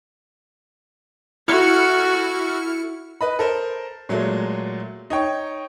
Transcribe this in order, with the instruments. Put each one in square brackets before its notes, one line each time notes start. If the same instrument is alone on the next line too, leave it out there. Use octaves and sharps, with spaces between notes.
[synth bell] E4 F6 C#7 [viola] F#4 A4
[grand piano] B4 D#5 B5
A4 A#4 C5
A#2 F#3 G#3 A3
D#4 C#5 G5 C#6